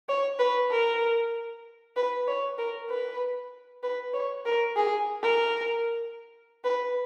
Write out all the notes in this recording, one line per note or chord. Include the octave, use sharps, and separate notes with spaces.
C#5
B4
A#4
B4
C#5
A#4
B4
B4
C#5
A#4
G#4
A#4
B4